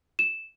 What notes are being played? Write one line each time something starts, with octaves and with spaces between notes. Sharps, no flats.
E7